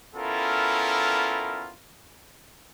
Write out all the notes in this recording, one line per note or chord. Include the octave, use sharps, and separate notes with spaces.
B3 C#4 E4 F4 A4 A#4